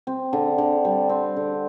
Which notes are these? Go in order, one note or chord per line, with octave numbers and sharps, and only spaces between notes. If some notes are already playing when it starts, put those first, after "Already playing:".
C4
D3
D3
G3
C4
D3